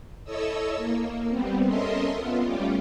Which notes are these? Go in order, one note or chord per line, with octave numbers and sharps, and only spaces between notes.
E4 A4 C#5 D#5 E6
A#3
G3 B3 C4
C#4 A4 A#4 D#5 E5 C6
B3 F4
G3 A3 C#4 F4 G4